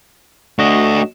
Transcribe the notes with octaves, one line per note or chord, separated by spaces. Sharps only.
A3 D4 F#4 D#5